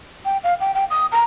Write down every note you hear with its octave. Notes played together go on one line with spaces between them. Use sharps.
G5
F5
G5
G5
D#6
A#5